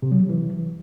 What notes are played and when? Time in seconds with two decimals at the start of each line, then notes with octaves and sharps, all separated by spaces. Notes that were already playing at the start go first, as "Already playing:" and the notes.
0.02 C3
0.11 F#3
0.20 F3
0.29 E3